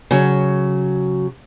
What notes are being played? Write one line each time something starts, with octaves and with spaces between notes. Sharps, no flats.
C#3 F#3